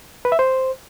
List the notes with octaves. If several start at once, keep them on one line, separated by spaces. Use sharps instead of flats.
B4
E5
C5